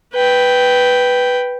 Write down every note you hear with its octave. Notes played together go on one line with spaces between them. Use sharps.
B4 G5